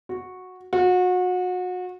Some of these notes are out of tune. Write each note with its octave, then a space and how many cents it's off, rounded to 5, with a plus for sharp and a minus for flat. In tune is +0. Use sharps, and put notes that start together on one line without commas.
F#4 -10
F#4 -30